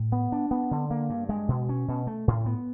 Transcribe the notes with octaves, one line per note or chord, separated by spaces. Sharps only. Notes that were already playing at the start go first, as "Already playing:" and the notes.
Already playing: A2
B3
D4
B3
D3
A#3
G2
G#3
B2
C#4
B2
A3
A2
B3